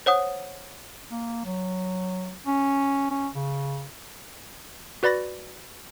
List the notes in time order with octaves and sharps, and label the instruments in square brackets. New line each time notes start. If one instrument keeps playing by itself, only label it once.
[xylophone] C5 C#5 F#5 D#6
[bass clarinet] A#3
F#3
C#4
C#4
C#3
[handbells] F#4 B4 D5 B5 A6 A#6